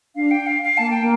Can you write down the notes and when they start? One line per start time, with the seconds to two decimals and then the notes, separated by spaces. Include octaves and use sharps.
0.15 D4 F5
0.31 G5
0.47 F5
0.63 F5
0.77 A#3 A5
0.90 G5
1.00 A#3